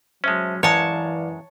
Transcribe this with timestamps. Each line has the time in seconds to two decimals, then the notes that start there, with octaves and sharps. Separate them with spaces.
0.24 F#3 G#3 C#4 C5 E5 A5
0.63 F#2 E3 G#3 B4 C#5 D5 F5 A5